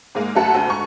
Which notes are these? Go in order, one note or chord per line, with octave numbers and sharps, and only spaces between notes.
G#2 G#3 A#3
F#2 A3 A4 F#5
D2
G#2 C#6